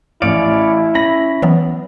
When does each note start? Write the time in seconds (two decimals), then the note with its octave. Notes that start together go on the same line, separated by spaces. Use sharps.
0.22 A1 E4 C#5 D5 F5 D7
0.95 C#4 B5 A#6
1.42 E3 F#3 B3